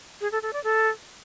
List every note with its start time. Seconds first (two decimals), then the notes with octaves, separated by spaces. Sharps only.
0.21 G#4
0.32 A4
0.42 A4
0.53 D5
0.64 A4